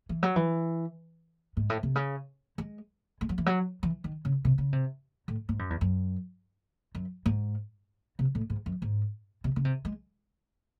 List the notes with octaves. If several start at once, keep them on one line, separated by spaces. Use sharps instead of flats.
E3
F#3
E3
G#2
A2
C3
C#3
G#3
G#3
F#3
E3
F#3
E3
D#3
C#3
C3
C#3
C3
A2
G#2
F#2
E2
F#2
F#2
G#2
C3
A2
G#2
F#2
G#2
C3
C#3
C3
G#3